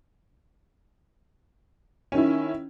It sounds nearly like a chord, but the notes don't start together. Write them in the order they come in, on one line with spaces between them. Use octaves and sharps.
C#4 D#3 E4